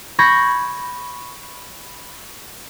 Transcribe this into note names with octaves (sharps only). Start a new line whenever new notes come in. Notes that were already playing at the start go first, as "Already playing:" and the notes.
B5 C#6 G6 G#6 A#6